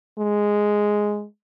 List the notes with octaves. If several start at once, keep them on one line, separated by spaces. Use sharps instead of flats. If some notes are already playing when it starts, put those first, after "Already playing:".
G#3